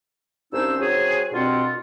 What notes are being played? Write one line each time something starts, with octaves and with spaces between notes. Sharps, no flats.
C2 G2 C#4 D#4 C5 E6
F#3 C4 F#4 G#4
C2 G2 B2 C4 F4 F#5